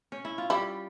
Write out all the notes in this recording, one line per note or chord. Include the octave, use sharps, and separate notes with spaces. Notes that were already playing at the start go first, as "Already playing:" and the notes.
C#4
E4
F4
G3 E4 G4